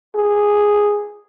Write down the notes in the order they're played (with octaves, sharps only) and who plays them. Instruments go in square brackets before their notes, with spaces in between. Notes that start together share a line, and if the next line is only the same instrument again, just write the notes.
[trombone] G#4